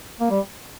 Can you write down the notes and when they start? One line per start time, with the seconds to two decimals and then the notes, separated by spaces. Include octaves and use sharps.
0.20 A#3
0.30 G3